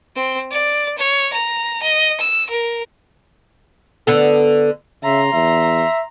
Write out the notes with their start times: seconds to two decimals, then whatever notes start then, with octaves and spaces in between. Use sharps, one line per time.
0.16 C4
0.51 D5
0.98 C#5
1.33 A#5
1.82 D#5
2.20 E6
2.49 A#4
4.07 D3 B3 A4
5.04 C#3 E5 A#5 C6
5.33 E2 E5